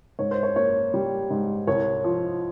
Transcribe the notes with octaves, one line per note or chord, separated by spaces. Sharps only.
G#2 C#5
C5
C#5
A#3 C#5
G3
G#2
C2 C#5
F3